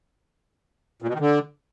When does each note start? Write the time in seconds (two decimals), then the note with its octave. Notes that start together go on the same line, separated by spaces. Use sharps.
1.02 A#2
1.08 B2
1.14 D#3
1.20 D3